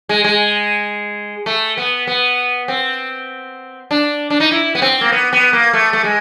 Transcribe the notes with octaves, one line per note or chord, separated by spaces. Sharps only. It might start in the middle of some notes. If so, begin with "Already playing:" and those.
G#3
G#3
A3
B3
B3
C4
D4
D4
D#4
E4
B3
C4
A#3
B3
B3
A#3
A3
A3
G#3